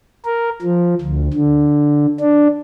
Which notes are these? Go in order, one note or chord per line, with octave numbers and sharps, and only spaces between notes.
A#4
F3
D2
D3
D4